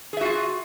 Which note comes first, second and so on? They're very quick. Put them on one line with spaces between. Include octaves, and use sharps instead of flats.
G#4 E5 F#4 F4